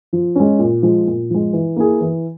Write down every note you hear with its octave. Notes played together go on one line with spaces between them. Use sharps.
F3
G#3 C#4
A#2
F3 G#3
A#2
F3 G#3
E3
A#3 E4 G#4
E3